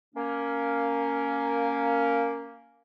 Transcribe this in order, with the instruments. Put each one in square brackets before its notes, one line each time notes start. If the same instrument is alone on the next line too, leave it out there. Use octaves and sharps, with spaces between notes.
[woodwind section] A#3 C#4